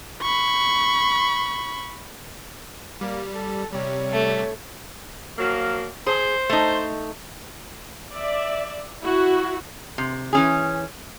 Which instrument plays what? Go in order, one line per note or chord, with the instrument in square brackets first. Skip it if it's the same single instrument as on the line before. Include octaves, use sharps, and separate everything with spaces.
[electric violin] B5 C#6
[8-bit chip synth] G3 [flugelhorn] A#3
[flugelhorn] A4
[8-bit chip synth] C3 G3 [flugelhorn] C#5
[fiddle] A3
[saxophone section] F3 F#3 A#3
[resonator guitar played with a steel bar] G#4 [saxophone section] C5
[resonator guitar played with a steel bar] A3 D#4
[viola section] D5 E5
E4 F#4
[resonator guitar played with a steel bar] C3
E3 C#4 G#4